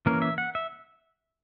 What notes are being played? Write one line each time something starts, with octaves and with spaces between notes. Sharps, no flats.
E3 A#3 C#4 A#4
E5
F#5
E5